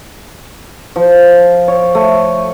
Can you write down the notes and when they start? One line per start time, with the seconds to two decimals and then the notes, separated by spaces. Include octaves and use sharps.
0.96 F3
1.68 C#5
1.95 A3